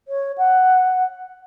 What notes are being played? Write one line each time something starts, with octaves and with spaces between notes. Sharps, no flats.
C#5
F#5